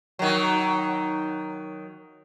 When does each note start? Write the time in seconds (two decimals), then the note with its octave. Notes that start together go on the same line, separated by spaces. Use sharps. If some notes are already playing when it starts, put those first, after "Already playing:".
0.19 D#3 F#3